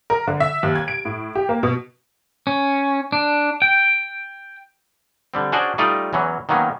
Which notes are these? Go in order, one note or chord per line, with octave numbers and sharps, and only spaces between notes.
A#4
D3
E5
D#2
G#6
D7
A2
G4
A#3
B2
C#4
D4
G5
D3 G3 C4
C#4 D4 F#4 G#4 C5 D5
G3 A3 D#4 F4 D5 D#5
E2 E3 F#3 C#4
D#3 F#3 A#3 B3 C#4